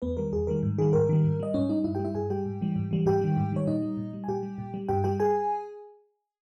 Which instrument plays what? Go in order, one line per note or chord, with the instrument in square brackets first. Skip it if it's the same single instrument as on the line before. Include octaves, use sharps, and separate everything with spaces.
[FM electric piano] E2 B3 B4
D#3 G3 A#4
E2 G#4
D#3 G3 A#4
G#2
D#3 G3 G#4
G#2 A#4
D#3 G3
G#2
G3 D#5
G#2 C#4 C#5
G3 D#4 D#5
G2 E4 E5
G4 G5
G3
E4 E5
G2 G#4 G#5
G3 G4 G5
G#2
E3 G3
G#2
E3 G3
G#2 G4 G5
D#3 G3
G#2
D#3 G3 C#5
A#2 D#4 D#5
G3
A#2
G3
G#5
A#2 G4 G5
G3
A#2
G3
G2 G4 G5
G3 G4 G5
G#4 G#5